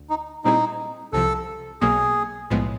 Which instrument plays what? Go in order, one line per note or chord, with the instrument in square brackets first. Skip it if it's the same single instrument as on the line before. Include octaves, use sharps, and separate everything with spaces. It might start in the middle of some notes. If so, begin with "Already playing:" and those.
Already playing: [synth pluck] D2
[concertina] D#4
[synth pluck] A#2 G3 C4 E4 G#4 [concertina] D#4
[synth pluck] C2 C3 F3 [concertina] A4
[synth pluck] B1 B2 F#3 A#3 [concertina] G#4
[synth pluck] B1 A2 F3 G#3 B3